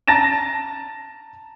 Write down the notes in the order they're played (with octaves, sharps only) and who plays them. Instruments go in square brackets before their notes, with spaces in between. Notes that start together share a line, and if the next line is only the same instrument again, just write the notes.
[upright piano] A5 A#5 A6 A#6 E7